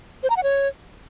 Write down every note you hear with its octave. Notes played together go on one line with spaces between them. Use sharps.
C5
A#5
F#5
C#5